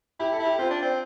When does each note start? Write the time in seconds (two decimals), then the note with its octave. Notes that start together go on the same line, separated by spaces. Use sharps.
0.19 E4 G4
0.32 A4
0.39 E4
0.45 G4
0.59 C4 F4
0.71 D4
0.82 C4